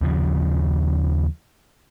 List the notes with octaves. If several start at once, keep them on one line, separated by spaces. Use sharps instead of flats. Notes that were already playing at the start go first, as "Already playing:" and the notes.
D#2 C#3 F3